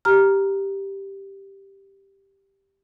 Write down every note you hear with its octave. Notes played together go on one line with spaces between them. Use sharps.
G4 A#5 F6